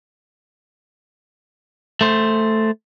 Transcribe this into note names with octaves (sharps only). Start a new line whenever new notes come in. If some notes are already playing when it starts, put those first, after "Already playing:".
A3 C5